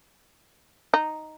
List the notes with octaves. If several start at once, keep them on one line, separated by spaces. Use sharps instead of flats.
D#4